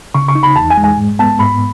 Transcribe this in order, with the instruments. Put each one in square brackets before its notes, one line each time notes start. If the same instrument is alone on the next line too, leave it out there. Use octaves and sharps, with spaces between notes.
[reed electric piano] C#3 [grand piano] C#6
[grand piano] C#6
[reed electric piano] D#4
[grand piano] B5
[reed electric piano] E2 [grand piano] A5
[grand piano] G#5
[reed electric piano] G#3
[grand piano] G#5
[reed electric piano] G#2
[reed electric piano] B3 [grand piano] A5
[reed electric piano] G#2 [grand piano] B5